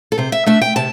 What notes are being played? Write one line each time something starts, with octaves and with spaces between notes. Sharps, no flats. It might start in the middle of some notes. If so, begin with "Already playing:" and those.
A4
C3 C5
E5
A3 D4 E5
G5
C3 A5